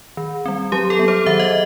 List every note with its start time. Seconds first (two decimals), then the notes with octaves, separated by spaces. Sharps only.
0.17 D#3
0.46 G3 C4
0.72 F#3 G4
0.90 A4
0.99 B3
1.08 C5
1.26 D#3 E5
1.40 D#5